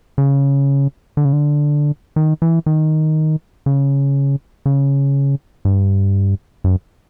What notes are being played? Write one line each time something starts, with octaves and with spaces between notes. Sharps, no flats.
C#3
D3
C#3
D3
D#3
E3
D#3
C#3
C#3
G2
F#2